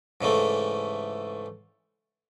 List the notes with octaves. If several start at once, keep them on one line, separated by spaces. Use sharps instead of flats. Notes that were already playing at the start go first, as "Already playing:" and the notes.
G#2 C#3 E3 A3